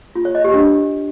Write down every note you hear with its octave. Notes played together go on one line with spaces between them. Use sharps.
F4
C#5
D#5
G4
D4